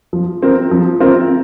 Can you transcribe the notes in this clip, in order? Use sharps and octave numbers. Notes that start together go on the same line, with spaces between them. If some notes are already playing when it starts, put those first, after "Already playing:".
F3
C4 F4 A#4
F3
C4 F4 A#4